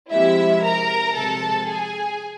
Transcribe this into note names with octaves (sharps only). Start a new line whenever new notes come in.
C3 F3 G#3 E4 E5
A#4 A#5
C3 F3 G#3 A4 A5
G#4 G#5